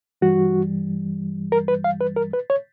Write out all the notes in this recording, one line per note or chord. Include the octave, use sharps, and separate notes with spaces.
G2 E3 G3 F#4
A#4
B4
F5
B4
A#4
B4
C#5